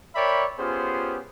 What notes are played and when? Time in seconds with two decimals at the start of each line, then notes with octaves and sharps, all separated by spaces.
0.15 A#4 C#5 D5 E5 G5 B5
0.59 B3 C#4 F4 G4 G#4 C5